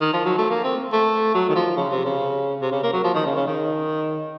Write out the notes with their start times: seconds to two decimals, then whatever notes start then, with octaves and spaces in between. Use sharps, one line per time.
0.01 D#3
0.13 F3
0.25 F#3
0.38 A3
0.50 A#3
0.64 C4
0.92 A3
1.34 F#3
1.49 D#3
1.55 F3
1.77 C#3
1.91 C3
2.05 C#3
2.61 C3
2.72 C#3
2.83 A#3
2.93 F#3
3.04 F3
3.14 D#3
3.25 C#3
3.36 C#3
3.47 D#3